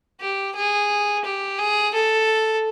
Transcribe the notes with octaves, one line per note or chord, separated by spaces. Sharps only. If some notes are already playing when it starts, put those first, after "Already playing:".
G4
G#4
G4
G#4
A4